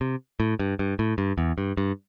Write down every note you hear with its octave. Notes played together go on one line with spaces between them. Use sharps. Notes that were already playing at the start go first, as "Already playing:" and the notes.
C3
A2
G2
G2
A2
G2
E2
G2
G2